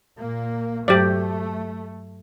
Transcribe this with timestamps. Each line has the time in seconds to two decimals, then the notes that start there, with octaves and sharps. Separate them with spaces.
0.17 A#2 A#3
0.88 G2 F#3 A3 G4 C5 D5